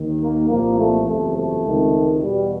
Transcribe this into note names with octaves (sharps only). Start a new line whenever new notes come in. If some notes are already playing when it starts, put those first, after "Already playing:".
Already playing: D#2 D#3
A#3
C2 A#2 F3 A#3
A3
F#1 E2 C3 F3 A3
A3
C#2 C3 D#3
E2 B2 G3